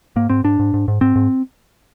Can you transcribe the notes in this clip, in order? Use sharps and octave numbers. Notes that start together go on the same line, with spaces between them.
G#2 A#3
G#2 C4
G#2 D4
G#2
G#2
G#2
G#2 C4
G#2